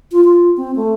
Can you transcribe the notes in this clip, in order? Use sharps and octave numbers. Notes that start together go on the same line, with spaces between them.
F4
F4
C4
A3